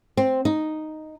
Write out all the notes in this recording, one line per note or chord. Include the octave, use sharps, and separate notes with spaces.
C4
D#4